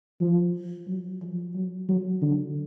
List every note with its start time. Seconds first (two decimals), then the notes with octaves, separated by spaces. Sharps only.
0.21 F3
0.87 F#3
1.22 F3
1.55 F#3
1.88 F#3
2.22 D3